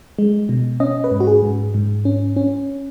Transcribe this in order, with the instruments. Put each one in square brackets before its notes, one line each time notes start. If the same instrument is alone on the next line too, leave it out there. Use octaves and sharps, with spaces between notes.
[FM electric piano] G#3
B2
C#4 D#5
B4
G#2
F#4
G#4
G#2
G#2
C#4
C#4